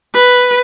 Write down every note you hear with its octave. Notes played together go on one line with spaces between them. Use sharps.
B4